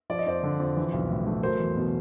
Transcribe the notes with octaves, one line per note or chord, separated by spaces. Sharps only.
F3 D5
D#5
F2 C5 D5
D3
F2
E3
B1
A2
A3
F#3 A#4 C5
E2
B2